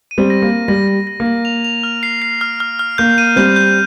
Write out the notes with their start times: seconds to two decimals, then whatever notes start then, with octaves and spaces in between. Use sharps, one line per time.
0.11 D#7
0.18 G3 C4
0.30 A#6
0.42 A#3
0.49 A#6
0.68 G3 A#6
0.88 A#6
1.07 A#6
1.20 A#3
1.26 A#6
1.45 F7
1.64 F7
1.83 F6
2.03 C7
2.22 C7
2.41 F6
2.60 F6
2.79 F6
2.98 A#3 G6
3.18 D#7
3.36 G3 C4 G6
3.56 G6